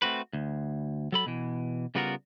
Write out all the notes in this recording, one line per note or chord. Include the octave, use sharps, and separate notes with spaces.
A3 C4 F#4 B4
D2
F#3 A4 B5
B2 E3
C#3 G3 B3 F4 F#4 A#4